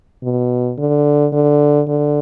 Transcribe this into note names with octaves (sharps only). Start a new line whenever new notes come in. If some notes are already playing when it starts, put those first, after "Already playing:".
B2
D3
D3
D3